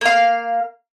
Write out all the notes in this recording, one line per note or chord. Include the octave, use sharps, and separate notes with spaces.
A#3 F5